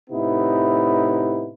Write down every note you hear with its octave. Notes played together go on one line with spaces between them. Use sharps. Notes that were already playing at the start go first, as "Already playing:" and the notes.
A2 C3 B3 D#4 E4